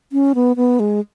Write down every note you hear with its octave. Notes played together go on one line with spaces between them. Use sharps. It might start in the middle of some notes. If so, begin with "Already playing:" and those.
C#4
B3
B3
G#3